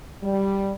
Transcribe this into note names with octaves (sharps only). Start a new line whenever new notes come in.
G3